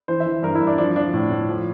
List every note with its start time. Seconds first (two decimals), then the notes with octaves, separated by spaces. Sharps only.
0.08 E3 C5
0.20 E5
0.26 E3
0.43 G2 A#4
0.55 E4
0.61 G2
0.67 D4
0.78 F3 D4
0.96 F3 D4
1.14 A2
1.31 A2
1.49 F3